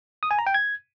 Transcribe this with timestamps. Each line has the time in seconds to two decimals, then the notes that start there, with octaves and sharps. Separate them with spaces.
0.23 D#6
0.31 G#5
0.39 A#5
0.47 G5
0.54 G#6